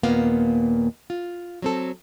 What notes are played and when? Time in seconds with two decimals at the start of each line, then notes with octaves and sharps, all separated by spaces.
0.03 D#2 A#2 A#3 B3 F5
1.10 F4
1.62 F#3 C4 A4